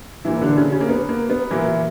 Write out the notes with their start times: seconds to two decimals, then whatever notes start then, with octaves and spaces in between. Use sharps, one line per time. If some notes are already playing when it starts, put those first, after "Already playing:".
0.25 A#2 E3 F#3 A#3 E4
0.41 D3 D4
0.57 C#3 C#4
0.72 C#3 C#4
0.81 A#3
0.89 B3
1.09 A#3
1.30 B3
1.51 A#2 E3 F#3 A#3 E4